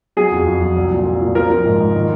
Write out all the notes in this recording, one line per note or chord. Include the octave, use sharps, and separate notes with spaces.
F#3 G#4
F2
F2
F#3
C2
A#2
A#2
A#2
F3 A#4
F3
G#2
G#2
D#3